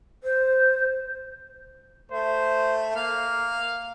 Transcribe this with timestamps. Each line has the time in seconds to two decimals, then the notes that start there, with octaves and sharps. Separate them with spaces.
0.24 C5
2.11 A3 C5
2.96 A#3 F5